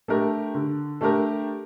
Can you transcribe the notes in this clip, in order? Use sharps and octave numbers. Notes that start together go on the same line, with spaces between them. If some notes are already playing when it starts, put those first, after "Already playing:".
A3 D4 G4 A#4
D3
A3 D4 G4 A#4